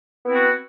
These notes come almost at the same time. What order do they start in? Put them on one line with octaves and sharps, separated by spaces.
B3 E4 C4 F#4